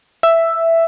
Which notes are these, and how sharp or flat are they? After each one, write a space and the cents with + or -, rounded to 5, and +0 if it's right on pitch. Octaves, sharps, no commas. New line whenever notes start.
E5 +5